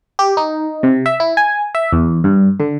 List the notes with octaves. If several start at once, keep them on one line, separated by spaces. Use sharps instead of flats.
G4
D#4
C3
E5
E4
G#5
E5
E2
G2
D3